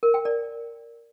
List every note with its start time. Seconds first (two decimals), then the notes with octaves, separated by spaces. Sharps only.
0.03 A#4
0.14 G5
0.25 D5